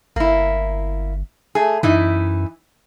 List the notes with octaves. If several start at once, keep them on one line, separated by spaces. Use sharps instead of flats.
G1 A#3 E4
A3 G#4
F#2 E3 D#4 E4